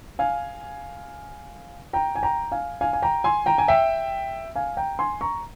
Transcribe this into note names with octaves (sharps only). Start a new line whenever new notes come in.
F5 G#5
G5 A#5
G#5
G5 A#5
F5 G#5
F5 G#5
G#5
G5 A#5
G#5 C6
G5 A#5
G#5
E5 G5
F5 G#5
G5 A#5
G#5 C6
A#5 C#6